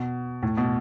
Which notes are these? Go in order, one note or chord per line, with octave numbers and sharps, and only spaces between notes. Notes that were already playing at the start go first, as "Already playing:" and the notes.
Already playing: B2
A2
B2